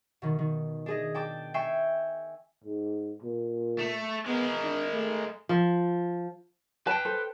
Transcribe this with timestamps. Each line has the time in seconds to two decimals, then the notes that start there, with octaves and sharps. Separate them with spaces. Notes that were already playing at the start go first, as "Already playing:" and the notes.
0.22 B2 D#3
0.39 D#3
0.86 D4 G#4 D#5
1.14 G5 A5 D6
1.54 E5 G5 G#5 C#6 C7
2.64 G#2
3.22 A#2
3.79 A3
4.26 G#3 B3 A#4
4.62 D4
4.92 A3
5.49 F3
6.87 B4 G5 A5
7.05 A4 C5